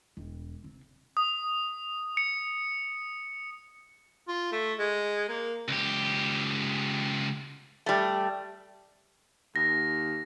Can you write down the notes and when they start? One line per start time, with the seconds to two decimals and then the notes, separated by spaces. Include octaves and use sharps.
0.17 E1
0.64 C3
1.17 D#6
2.17 C#7
4.28 F4
4.52 A3
4.79 G#3
5.29 A#3
5.68 C#2 G4
7.86 G3 A3
9.56 D#2 A#6